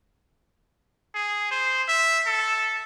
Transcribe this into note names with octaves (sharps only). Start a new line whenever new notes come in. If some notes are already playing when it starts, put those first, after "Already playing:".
G#4
C5
E5
A4